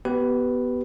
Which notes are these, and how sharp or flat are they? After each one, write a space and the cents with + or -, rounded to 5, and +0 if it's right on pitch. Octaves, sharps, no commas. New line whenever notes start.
B3 +0 G4 -25 B4 +0